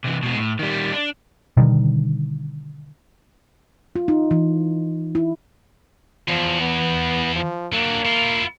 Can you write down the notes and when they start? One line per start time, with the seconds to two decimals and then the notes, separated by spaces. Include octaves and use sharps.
0.04 C3 E3
0.23 B2 G#3
0.37 A2
0.59 D#3 G3
0.92 D4
1.57 B2 D3 D#3 G3
3.96 F4
4.08 D#4
4.31 E3
5.15 E4
6.28 E2 F3
6.61 B3
7.36 F3
7.73 F#3 A#3 D4
8.05 E4 F4